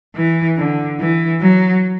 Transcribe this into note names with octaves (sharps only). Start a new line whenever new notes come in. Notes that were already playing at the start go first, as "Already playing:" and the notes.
E3
D3
E3
F#3